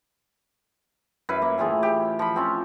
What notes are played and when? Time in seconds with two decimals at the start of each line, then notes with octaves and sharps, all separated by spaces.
1.29 F#2 E4 B4
1.42 A#3
1.58 A2 E3 F4 G#4
1.83 G4
2.19 F3 B5
2.36 C4 C#4 F4